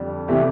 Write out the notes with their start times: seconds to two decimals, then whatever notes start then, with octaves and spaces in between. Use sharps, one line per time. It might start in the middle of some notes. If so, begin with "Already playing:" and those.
Already playing: F2 D3 G3
0.28 C3 E3 A3 G4